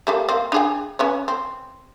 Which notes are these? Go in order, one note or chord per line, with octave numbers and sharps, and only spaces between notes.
G3 A3 A#3
A#3 C4
D4 G#4 G5
C#4 B4 C#5
C4